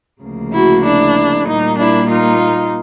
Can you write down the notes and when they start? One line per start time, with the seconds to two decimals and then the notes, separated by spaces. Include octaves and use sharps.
0.23 D2 C#3 F3 A#3
0.54 E4 F#4
0.85 D4 E4
1.47 A#2 G3 A#3 D#4
1.78 D4 E4
2.09 D#4 F4